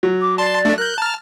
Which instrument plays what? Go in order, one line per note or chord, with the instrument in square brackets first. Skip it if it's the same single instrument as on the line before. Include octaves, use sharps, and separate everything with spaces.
[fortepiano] F#3
[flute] D6
[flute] D5 [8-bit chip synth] A5 C6
[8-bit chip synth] A3 D4
[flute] A#4 [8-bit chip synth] F#6 G6
[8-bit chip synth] A5 F6 [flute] A#5